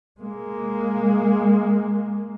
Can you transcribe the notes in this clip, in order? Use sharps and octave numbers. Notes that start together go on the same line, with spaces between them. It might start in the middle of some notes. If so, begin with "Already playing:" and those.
G#3 A#3